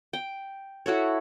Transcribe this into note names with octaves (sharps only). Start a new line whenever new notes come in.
G5
E4 F#4 A4 C#5